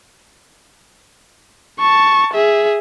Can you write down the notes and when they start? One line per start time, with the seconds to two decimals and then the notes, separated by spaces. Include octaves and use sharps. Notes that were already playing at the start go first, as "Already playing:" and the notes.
1.79 A5 C#6
2.34 G#4 E5